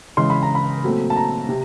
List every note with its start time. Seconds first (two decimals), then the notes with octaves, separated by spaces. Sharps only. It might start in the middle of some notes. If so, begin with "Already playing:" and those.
0.17 C#3 E3 G#3 C6
0.30 B5
0.43 A#5
0.55 B5
0.83 A#2 F#3 A3 C4
1.10 A5
1.16 A#5
1.49 C3